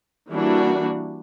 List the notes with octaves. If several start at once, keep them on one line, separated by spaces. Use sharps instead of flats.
E3 G3 A#3 D4 F#4